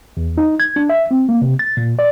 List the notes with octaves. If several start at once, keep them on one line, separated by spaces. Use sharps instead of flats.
E2
D#4
G#6
D4
E5
C4
A#3
C3
A6
A#2
D5